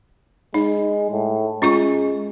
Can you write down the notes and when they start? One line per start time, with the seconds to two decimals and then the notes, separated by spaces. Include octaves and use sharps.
0.54 G#3 D#4
1.11 A2
1.62 G#3 C#4 F4 C#6